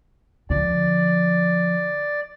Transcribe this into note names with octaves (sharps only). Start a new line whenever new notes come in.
D3 F3 D5